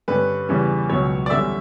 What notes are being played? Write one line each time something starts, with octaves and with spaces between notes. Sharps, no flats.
G2 D3 G3 C#4 B4
E2 C#3 E3 G3 C#4
C#2 B2 F#3 C#5
D5
E2 D3 G3 C#4 E5